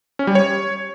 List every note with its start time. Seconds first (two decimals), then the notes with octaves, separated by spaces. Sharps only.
0.19 C#4
0.27 G3
0.35 C#5